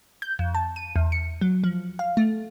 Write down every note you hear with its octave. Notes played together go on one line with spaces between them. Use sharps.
G6
F2
A5
D#7
E2
C#7
F#3
F3
F5
A3